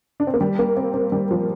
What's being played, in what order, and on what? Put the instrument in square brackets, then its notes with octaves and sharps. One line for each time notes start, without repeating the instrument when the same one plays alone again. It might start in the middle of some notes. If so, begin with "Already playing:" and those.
[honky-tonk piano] D4
C4
A#3
G3
A#3
C4
C4
G3
F3